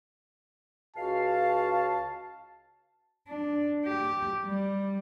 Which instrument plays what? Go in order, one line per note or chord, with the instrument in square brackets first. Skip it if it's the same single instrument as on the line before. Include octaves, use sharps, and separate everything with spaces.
[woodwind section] C#2 F#4 F5 [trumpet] A5
[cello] D4
G4
G3